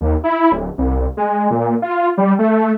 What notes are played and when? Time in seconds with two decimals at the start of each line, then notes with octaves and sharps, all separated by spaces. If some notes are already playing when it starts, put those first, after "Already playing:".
0.01 D#2
0.24 E4
0.52 D1
0.78 C2
1.17 G#3
1.51 A#2
1.82 F4
2.18 G3
2.39 A3